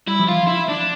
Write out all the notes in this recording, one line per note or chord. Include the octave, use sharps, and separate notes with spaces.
G3 E4
F3
E3 F4
F3 E4
D4